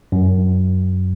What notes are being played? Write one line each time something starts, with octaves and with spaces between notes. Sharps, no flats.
F#2